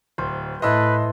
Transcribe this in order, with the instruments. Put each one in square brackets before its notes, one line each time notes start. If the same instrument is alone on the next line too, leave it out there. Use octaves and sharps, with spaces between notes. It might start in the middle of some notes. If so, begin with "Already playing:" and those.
[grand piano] D1 [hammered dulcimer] C5
[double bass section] A2 [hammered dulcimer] E3 A4 C6 [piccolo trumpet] B4 [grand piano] D#5 E6